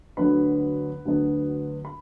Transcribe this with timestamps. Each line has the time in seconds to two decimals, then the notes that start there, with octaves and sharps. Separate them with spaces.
0.17 D2 D3 F#3 B3 B4 B5
1.05 D2 D3 F#3 B3
1.85 B5